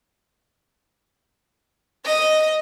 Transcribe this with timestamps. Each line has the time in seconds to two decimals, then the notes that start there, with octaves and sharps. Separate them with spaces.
2.06 D#5